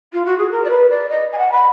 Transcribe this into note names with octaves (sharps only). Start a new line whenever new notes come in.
F4
F#4
G#4
A#4
D5
B4
D5
D#5
G#5
F#5
B5